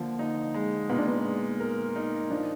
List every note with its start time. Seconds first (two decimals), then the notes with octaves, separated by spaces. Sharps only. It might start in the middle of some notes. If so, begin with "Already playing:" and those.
Already playing: D3 F3 A#3
0.19 D#4
0.54 G#3
0.90 A#2 B3
0.99 D4
1.07 B3
1.25 G#3
1.60 A#4
1.96 D#4
2.30 F3 D4